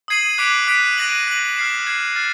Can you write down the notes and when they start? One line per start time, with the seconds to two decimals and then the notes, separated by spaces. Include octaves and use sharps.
0.08 D#6 G#6 C7 D#7 F#7
0.38 D6 F#6 B6 D7
0.67 D6 F#6 B6 D7
0.98 F#6 A#6 D#7 F#7
1.27 F#6 A#6 D#7 F#7
1.56 F6 G#6 C7 E7
1.86 F6 G#6 C7 E7
2.16 F6 A6 C7